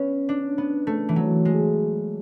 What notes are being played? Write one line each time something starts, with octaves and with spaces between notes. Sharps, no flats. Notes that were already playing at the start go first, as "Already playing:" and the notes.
Already playing: B3 C#4
D4
B3
A3
E3
F#3
G#3